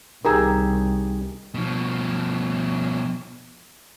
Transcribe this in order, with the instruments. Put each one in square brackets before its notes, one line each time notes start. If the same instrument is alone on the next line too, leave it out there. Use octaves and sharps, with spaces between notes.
[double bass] C2 [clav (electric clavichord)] D#3 G4 G#4 [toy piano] A#4 A#5 E6
[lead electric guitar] B2 F3